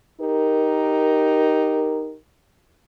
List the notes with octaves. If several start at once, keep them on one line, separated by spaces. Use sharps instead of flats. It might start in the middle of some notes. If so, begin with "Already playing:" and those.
D#4 G4 A#4